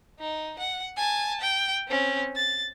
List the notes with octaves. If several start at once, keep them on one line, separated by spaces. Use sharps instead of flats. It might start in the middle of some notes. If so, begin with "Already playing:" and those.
D#4
F#5
G#5 A5
G5
C4 C#4
A6